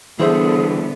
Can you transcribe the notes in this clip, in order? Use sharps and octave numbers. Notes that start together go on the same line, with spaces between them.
D3 E3 G3 B3 E4 G#4 C5 E5